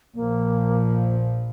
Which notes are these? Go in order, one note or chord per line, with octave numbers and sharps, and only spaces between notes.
A#1 A#2 F3 A#3